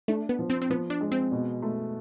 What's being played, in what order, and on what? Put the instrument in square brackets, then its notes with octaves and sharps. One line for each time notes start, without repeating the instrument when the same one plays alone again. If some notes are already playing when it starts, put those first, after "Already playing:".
[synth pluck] A3 [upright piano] D4
[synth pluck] B3
[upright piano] F3
[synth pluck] C4
C4
[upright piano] F3 [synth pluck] B3
[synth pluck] D4
[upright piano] G#3
[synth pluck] C4
[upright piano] B2
A3